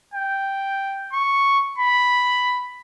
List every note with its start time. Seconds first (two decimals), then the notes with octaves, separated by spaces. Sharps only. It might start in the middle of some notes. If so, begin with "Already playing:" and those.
0.14 G5
1.13 C#6
1.78 B5